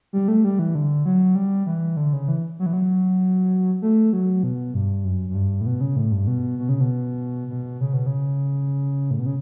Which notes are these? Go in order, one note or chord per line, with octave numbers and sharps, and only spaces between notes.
G3
A3
G3
E3
D3
F#3
G3
E3
D3
C#3
E3
F#3
E3
F#3
A3
F#3
B2
G2
F#2
F#2
G2
A2
B2
C#3
A2
G2
B2
B2
C#3
B2
B2
C#3
B2
C#3
A2
B2
C#3